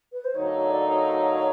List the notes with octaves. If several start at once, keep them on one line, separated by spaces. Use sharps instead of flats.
B4
C5
D2 D3 F#3 A#3 D#4 C#5
D5
C#5